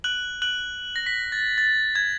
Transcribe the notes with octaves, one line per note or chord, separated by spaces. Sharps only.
F#6 F#7
F#6 F#7
A#6
B6
A6
A6
G#6